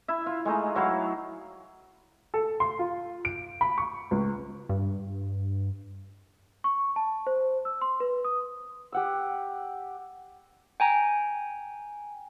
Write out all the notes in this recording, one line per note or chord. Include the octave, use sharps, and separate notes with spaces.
E4 E5
F4
G#3 A3 D#4
F#3 E4 F5
A4
C6
F4
D7
B5
C#6
C#2
G2
C#6
A5
C5
E6
C6
B4
D#6
G4 F#5 E6
G5 G#5 A#5